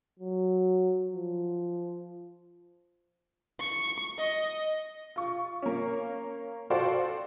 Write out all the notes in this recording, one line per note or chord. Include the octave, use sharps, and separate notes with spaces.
F#3
F3
C#6
D#5
F4 C#6
A#3 C#4
F#4 A4 C5 D5 F5 G5